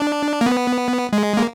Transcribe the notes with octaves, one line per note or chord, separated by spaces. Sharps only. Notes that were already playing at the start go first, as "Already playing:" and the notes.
Already playing: D4
A#3
B3
G#3
A#3